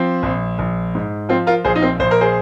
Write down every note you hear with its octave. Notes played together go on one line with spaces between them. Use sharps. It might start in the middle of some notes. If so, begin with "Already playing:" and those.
Already playing: F3 C4
A#1
A#1
G#2
F3 C4 F4
F4 A#4
A#1 G#4 C5
D#4
C4
A#1 C5
A#4
G#4 C5